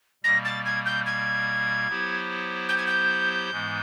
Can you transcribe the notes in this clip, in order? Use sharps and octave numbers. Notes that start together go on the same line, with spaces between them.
B2 G3 A#3 A#6
A6
G#6
G6
G#6
F#3 B3 E4 G4 C5
G6
G#6
G6
G#2 E3 G#3 B3